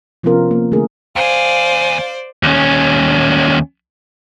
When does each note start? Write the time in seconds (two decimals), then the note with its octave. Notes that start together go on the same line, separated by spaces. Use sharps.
0.23 C3 F3 B3 C#4 F4 A#4
0.51 A#3
0.72 D3 A3 C4 D4 G#4 A#4
1.16 D#2 G#4 C5 D5 F5
2.43 D#2 C#4